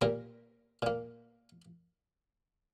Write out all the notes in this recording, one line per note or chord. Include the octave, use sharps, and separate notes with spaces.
A#2 G3 A#3 A#4
A#2 A#3